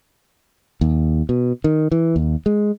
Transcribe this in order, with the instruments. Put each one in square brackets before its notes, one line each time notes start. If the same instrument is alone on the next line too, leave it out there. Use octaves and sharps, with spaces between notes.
[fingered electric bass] D#2
B2
D#3
E3
D#2
G#3